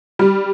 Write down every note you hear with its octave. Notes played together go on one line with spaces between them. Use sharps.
G3